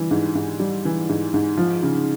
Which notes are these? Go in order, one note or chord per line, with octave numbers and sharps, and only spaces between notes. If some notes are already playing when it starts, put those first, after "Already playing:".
Already playing: E3 G3
G#2
G#2
G3
E3
G#2
G#2
F3
C#3